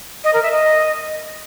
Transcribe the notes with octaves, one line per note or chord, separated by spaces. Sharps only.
D#5
A#4
E5
D#5